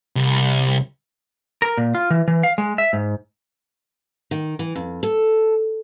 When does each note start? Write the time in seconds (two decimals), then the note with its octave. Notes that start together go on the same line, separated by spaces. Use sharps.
0.16 C2
1.62 A#4
1.78 A#2
1.95 F4
2.10 E3
2.28 E3
2.43 F5
2.58 G#3
2.78 E5
2.93 G#2
4.31 D#3
4.59 E3
4.75 F2
5.03 A4